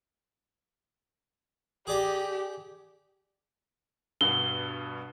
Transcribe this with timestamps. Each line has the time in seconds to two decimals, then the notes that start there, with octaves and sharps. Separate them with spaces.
1.87 G4 G#4 D5 A#5
4.21 G2 B2 G7